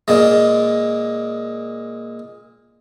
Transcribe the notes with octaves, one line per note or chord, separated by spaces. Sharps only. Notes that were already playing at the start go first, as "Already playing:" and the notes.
A#2 G#3